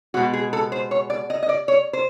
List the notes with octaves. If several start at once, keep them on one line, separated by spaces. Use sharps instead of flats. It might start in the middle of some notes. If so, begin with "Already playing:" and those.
B2 G#3 F#4
G#4
A4
C5
C#5
D5
D#5
D#5
D5
C#5
C5